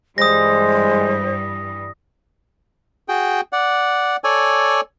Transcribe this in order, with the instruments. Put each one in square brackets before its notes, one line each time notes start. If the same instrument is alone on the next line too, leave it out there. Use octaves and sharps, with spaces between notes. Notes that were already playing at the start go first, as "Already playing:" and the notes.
[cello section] G2 E3 G3 [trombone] G#3 [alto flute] C5 [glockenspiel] D#6 A#6
[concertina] F#4 G#4 G5
D5 F#5
A4 C#5 D5 G#5